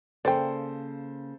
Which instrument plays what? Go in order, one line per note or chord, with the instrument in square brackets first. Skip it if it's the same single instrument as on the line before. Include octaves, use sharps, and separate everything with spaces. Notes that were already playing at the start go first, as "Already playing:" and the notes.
[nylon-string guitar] C#3 A#3 [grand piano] A4 C5 [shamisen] D5 G5